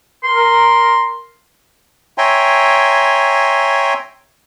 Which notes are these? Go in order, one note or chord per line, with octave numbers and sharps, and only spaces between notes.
A#4 C6
C#5 E5 G5 G#5 A#5 C6